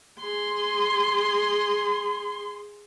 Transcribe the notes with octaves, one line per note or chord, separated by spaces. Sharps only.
G#4 C6